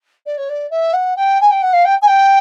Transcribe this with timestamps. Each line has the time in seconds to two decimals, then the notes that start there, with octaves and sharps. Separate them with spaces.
0.26 D5
0.37 C#5
0.49 D5
0.70 E5
0.93 F#5
1.16 G5
1.41 G#5
1.51 G5
1.62 F#5
1.73 F5
1.85 G5
2.02 G#5
2.07 G5